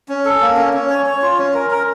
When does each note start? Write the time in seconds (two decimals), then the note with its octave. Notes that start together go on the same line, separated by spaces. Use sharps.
0.09 C#4
0.25 A4
0.41 A#3
0.57 C#4
0.73 C#4
0.90 C#5
1.06 C#5
1.22 F4
1.38 C#4
1.54 A#4
1.71 A#4